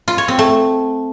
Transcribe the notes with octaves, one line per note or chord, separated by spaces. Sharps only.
F4
C#5
C4
A3